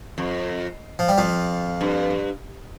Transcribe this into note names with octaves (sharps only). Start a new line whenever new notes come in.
F2
F3
G3
F2 F3
G2